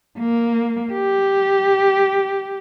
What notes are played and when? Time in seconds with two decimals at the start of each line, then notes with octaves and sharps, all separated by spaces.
0.19 A#3
0.93 G4